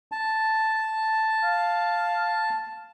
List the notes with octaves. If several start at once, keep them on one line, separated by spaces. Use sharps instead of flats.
A5
F5